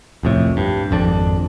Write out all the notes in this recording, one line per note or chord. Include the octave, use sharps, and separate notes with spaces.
C2 F2 A2
G2
G#1 F2 D4